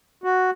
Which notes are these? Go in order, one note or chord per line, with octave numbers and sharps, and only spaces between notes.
F#4